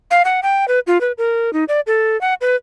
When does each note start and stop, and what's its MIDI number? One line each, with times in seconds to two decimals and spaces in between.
0.11 0.22 77
0.25 0.40 78
0.43 0.68 79
0.68 0.80 71
0.87 1.01 65
1.01 1.12 71
1.18 1.53 70
1.53 1.64 63
1.68 1.80 74
1.87 2.20 69
2.21 2.34 78
2.41 2.56 71